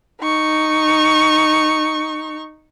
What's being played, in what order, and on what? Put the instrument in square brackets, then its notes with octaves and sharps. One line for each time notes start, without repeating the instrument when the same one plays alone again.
[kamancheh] D#4 C#6